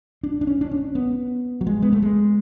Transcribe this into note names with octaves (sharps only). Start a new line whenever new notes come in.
D4
D4
C#4
D4
C#4
B3
F#3
G#3
B3
A3
G#3